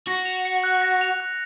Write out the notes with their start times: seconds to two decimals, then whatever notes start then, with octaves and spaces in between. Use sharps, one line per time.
0.07 F#4 A#6
0.25 F7
0.45 C#7
0.64 F#6
0.82 A#6
1.01 F7
1.20 F#6